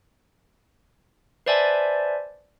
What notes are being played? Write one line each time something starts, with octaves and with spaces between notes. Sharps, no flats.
B4 C5 D5 E5 G#5 A5